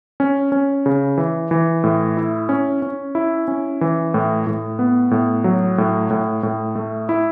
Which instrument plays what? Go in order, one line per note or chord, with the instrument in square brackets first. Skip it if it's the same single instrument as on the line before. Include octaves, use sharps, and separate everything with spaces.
[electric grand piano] C#4
C#4
C#3
E3
E3
A2
E4
C#4
C#4
E4
C#4
E3
A2
A2
B3
A2
F#3
A2
A2
A2
A3
E4